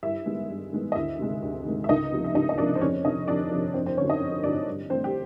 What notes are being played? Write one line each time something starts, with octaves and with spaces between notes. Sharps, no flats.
G2 E4 E5
D#3 G#3 B3
G2
D#3 G#3 B3
D#5
D2 E4 E5
C3 D#3 G#3
D2
C3 D#3 G#3
E5
C#2 D#4 D#5
C3 F3 A#3
E5
C#2 D#4 D#5
D#5
C3 F3 A#3 D4 D5
C5
F2 C#4 C#5
C3 F3 D#4 D#5
F2 D4 D5
C3 F3
F2 C4 C5
C4 C5
D3 F#3 C#4 C#5
D#4 D#5
F2
D3 F#3 D4 D5
G2
E3 A3 C4 C5
G4